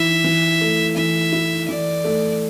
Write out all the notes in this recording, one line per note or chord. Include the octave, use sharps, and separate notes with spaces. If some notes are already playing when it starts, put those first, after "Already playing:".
Already playing: E3 E4 E5
E3
A3
E3 E5
E4
E3 D5
A3